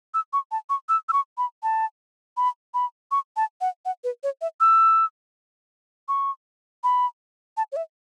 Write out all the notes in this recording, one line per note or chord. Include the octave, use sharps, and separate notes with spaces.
E6
C#6
A5
C#6
E6
E6
C#6
B5
A5
B5
B5
C#6
A5
F#5
F#5
B4
C#5
E5
E6
C#6
B5
A5
C#5
E5